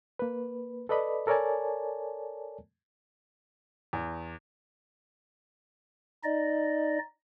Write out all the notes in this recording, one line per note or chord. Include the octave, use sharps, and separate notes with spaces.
A#3 B4
A4 B4 D5 D#5 B5
A4 A#4 C#5 D5 G#5 A5
E2
D#4 D5 D#5